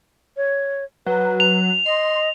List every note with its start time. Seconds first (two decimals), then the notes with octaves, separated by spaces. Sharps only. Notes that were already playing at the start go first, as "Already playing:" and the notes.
0.37 C#5
1.06 F#3 B4
1.40 F7
1.86 D#5 C6